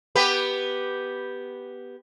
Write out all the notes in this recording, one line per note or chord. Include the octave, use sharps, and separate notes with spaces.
B3 G4 B4